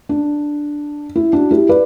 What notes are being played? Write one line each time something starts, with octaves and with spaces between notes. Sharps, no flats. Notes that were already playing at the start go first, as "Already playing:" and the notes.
D4
E4
D4 F#4
E4 G4
B4 D5